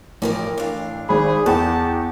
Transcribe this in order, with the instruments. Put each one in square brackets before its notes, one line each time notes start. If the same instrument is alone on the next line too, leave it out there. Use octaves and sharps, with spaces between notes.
[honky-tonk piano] A1 [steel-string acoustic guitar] F3 A#4 D5
[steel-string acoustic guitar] D4 F5
[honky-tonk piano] G#1 B5 [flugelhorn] G#4
[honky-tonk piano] E2 G5 [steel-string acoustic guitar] F#5 [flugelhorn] A5